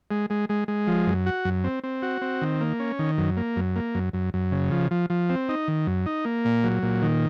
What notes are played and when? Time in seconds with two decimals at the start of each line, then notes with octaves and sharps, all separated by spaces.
0.11 G#3
0.30 G#3
0.49 G#3
0.68 G#3
0.87 F3
1.07 F#2
1.26 F#4
1.45 F#2
1.64 C4
1.83 C4
2.02 F#4
2.22 C4
2.42 D#3
2.61 A#3
2.80 C#4
2.99 D#3
3.18 F#2
3.37 A#3
3.56 F#2
3.76 A#3
3.95 F#2
4.13 F#2
4.34 F#2
4.52 C#3
4.71 F3
4.91 F3
5.10 F3
5.30 C4
5.49 D#4
5.68 D#3
5.87 F#2
6.06 D#4
6.25 A#3
6.45 A#2
6.64 F#3
6.83 A#2
7.02 D#3